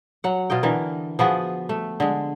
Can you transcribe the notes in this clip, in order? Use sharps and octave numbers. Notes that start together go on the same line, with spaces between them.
F#3 F#5
B2 F4 D#5 G5
D3 E3 A#4
F3 B3 F#4 G#4
A3
D3 G#3